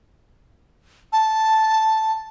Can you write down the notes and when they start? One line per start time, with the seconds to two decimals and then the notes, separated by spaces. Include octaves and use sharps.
1.13 A5